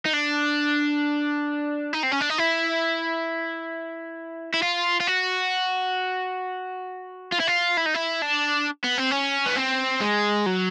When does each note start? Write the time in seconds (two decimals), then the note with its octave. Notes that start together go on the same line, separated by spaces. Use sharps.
0.05 D#4
0.13 D4
1.93 D#4
2.03 C4
2.11 C#4
2.21 D4
2.30 D#4
2.38 E4
4.54 E4
4.62 F4
5.00 F4
5.07 F#4
7.32 F4
7.40 E4
7.47 F4
7.77 E4
7.86 D#4
7.94 E4
8.22 D4
8.84 B3
8.98 C4
9.11 C#4
9.46 B3
9.56 C4
10.01 G#3
10.46 F#3